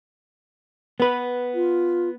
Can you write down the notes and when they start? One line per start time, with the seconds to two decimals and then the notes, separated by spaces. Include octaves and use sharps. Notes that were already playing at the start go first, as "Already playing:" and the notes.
1.00 B3 B4
1.54 F4